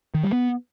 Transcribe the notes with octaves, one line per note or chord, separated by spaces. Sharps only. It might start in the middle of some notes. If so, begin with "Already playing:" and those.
D#3
G3
B3